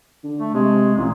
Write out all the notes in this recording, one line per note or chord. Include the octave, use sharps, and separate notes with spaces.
D3
A3
C3 G#3
A1 A#2